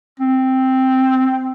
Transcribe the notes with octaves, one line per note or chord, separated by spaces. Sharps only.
C4